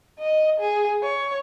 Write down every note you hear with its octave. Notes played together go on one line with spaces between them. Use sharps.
D#5
G#4
C#5